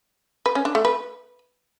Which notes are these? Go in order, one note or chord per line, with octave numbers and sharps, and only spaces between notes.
B4
C#4
D4
A3
B4